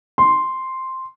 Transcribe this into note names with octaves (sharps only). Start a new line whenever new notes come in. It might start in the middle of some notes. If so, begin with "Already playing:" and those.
C6